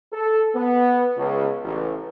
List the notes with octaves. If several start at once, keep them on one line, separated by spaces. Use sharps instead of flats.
A4
B3
C#2
A1